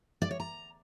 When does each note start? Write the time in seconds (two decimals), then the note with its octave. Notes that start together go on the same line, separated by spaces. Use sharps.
0.22 D5
0.31 C#5
0.40 A#5